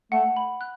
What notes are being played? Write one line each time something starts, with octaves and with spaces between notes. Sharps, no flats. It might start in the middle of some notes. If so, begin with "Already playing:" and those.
A3 F#5
B5
F#6